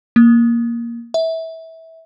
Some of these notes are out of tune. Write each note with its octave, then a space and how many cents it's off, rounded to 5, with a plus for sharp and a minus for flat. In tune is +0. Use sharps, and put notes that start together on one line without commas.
A#3 +5
E5 -20